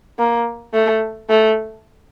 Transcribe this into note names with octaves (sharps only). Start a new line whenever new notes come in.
A#3
A3
A3